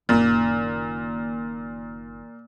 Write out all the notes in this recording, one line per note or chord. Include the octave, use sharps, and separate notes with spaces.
F#1 A#2 D#3